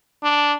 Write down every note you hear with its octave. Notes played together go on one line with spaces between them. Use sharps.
D4